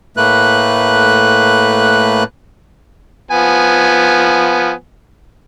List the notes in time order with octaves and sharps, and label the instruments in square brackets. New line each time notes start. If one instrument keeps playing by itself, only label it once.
[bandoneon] A2 A3 A#3 B4 F#6
[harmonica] F3 B3 G#5